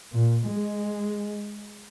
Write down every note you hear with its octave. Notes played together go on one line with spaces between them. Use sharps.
A#2
G#3